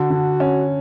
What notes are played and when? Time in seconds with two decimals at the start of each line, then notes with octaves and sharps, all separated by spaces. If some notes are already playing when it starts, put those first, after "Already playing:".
Already playing: D3 F#4
0.10 D3
0.40 C#4